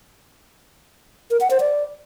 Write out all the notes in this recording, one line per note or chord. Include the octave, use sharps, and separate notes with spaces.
A#4
F#5
C5
D5